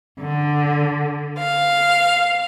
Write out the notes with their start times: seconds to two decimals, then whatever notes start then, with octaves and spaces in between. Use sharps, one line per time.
0.19 D3
1.38 F5